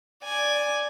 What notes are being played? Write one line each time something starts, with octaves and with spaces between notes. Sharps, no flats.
D5 G#5